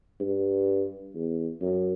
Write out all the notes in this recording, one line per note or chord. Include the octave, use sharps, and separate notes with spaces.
G2
E2
F#2